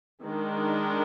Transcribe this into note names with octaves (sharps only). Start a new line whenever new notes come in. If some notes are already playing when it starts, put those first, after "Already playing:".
D#3 G#3 D4